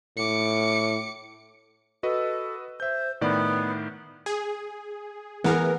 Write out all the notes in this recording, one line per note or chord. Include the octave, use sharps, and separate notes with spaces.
A2 D6 C#7
F#4 A4 B4 D#5
C5 E5 G6
A2 D#3 B3 D5
G#4
E3 B3 G#4 A#4